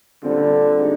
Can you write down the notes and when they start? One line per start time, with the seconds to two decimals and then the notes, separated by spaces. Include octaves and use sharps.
0.23 A#2 D3 G3 C4 F4
0.79 G#3 D#4 G4